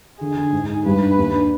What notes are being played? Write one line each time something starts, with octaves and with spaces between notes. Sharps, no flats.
D3 G#4
D3
G#2
D#4
G2 B4
D4
D#2
D4